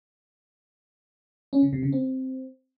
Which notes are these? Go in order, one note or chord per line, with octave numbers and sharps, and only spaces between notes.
C#4
C#3
C3
C#3
C4